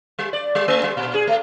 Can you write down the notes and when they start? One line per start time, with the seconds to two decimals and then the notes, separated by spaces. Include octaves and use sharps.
0.19 G3
0.33 D5
0.55 G3
0.68 A3
0.83 G3
0.97 A#2
1.14 G#4
1.27 A3